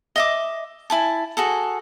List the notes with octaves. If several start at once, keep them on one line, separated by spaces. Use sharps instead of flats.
D#5 E5 D6
E4 G#5 A5
F#4 G#4 A4